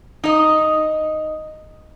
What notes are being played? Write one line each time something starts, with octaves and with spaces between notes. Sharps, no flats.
D#4 D#5